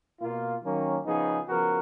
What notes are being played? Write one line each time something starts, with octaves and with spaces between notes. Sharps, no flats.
B2 A#3 F4
D#3 F#3 A#3 C#4
C#3 F3 B3 D#4 G#4
C#3 F3 B3 F#4 A#4